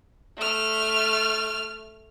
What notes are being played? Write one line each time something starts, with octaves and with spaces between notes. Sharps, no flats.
A3 F6